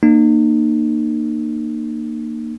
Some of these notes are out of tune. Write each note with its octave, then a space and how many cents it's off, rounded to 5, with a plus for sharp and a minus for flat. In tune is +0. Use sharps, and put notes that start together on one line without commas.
A#3 -5 D#4 -40